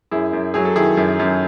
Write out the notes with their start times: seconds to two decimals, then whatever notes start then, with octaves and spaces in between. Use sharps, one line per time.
0.11 F#2 E4 G#4
0.33 F#2
0.54 F#3 G#4
0.65 A4
0.76 D#3 E4 G#4
0.97 F#2
1.19 F#2